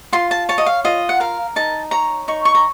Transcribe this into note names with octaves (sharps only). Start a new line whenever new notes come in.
F4 C6
A5
C#5 A5
D#5
F5
F4 D#5
F#5
A#4 F5
D#4 A5
C#5 A#5
D#4 C#6
C#6
A#5